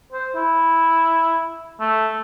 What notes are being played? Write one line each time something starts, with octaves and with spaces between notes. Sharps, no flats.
C5
E4
A3